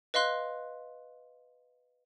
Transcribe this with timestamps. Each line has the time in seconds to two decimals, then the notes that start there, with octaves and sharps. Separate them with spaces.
0.14 B4 D#5 F5 C6 F#6